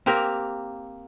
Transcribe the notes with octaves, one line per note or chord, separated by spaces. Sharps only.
A#3 C4 G4 A#4